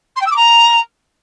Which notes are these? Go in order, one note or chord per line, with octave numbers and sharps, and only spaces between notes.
C6
G5
E6
D6
A#5